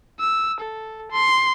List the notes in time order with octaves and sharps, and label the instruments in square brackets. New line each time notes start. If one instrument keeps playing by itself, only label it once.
[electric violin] E6
A4
C6